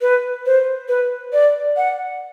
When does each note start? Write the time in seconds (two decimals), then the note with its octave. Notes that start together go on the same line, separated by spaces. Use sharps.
0.02 B4
0.46 C5
0.89 B4
1.33 D5
1.77 F#5